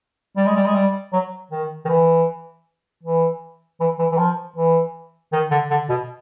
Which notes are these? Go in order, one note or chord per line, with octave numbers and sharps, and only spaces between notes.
G3
G#3
G3
G#3
G3
F#3
D#3
D#3
E3
E3
E3
E3
E3
F3
E3
D#3
D3
D3
B2